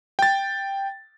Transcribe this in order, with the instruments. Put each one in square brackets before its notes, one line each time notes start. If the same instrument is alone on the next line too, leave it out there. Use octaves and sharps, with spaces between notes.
[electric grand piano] G5 A6